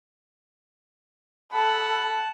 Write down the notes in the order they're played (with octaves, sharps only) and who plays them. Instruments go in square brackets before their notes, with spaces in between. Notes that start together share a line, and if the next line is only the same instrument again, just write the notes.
[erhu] A4 [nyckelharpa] F#5 [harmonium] A5 [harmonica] B5